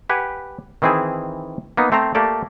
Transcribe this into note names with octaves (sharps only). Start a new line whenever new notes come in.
G4 B4 F#5 G#5
D#3 E3 C4 E4 G#4
A#3 B3 D#4
A3 C4 C5 A#5
A3 A#3 G4 A4 D5